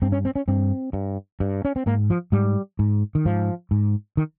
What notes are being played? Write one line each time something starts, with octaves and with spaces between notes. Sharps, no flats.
G2 C4
C#4
C4
C#4
G2 C4
G2
G2
C#4
C4
G#2 A#3
F3
G#2 G3
G#2
D#3
G#2 F3
G#2
D#3